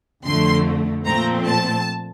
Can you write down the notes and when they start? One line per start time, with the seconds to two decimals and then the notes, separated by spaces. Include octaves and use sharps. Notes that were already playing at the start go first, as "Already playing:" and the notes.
0.25 F2 D3 F3 A3 C6
1.06 A#2 F3 A3 C4 A#5
1.46 A5